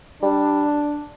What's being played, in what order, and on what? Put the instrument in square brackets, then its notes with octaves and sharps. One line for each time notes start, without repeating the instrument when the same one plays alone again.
[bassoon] G3 [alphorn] D4